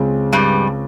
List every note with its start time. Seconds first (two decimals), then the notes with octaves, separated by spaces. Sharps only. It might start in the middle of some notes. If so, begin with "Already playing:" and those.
Already playing: C#2 C#3 G#3 C4
0.33 G2 G3